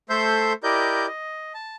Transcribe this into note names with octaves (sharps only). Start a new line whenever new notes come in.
A3 A4 C5 E5 C6 G6
E4 G4 A#4 D5 D#5 G6
D#5
A5